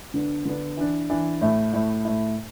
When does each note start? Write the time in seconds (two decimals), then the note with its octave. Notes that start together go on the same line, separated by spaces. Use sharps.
0.14 D3 B3 D4
0.45 D3 B3 D4
0.77 E3 D4
1.10 E3 D4
1.41 A2 A3 E4
1.73 A2 A3 E4
2.05 A2 A3 E4